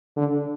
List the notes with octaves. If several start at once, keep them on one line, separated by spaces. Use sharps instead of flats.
D3